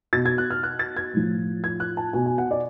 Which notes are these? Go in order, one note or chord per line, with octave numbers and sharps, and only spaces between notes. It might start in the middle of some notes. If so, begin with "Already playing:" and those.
B2 A6
G#6
F#6
F6
F#6
A6
G#6
A2 F3
G#6
F#6
A5
B2 G#5
G#5
F#5
D5